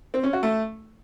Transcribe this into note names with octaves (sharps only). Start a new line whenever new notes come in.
C4
C#4
F#4
A3